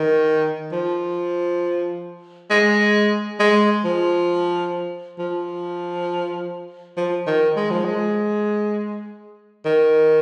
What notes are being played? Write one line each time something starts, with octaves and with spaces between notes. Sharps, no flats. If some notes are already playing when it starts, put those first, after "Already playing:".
Already playing: D#3
F3
G#3
G#3
F3
F3
F3
D#3
G#3
F3
G#3
D#3